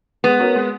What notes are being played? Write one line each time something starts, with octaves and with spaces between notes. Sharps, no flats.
G#3 B3
C#4 F#4 A#4
G#3